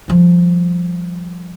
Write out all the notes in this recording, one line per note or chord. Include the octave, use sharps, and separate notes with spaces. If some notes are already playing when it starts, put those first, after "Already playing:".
F3 G3